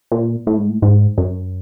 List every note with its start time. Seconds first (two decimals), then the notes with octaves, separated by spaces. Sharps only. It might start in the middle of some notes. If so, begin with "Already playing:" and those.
0.12 A#2
0.47 A2
0.58 G#2
0.69 A2
0.82 G#2
1.18 F#2